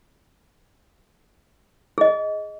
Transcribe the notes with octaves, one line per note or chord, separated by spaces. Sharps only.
G#4 D#5